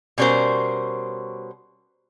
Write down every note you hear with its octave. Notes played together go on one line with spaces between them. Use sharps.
B2 G3 C#4 A#4 C5